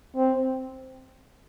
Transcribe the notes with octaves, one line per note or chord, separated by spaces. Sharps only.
C4